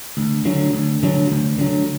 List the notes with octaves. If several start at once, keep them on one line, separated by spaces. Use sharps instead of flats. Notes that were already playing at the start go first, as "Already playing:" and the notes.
D2
D3 F#3
D2
D3 F#3
D2
D3 F#3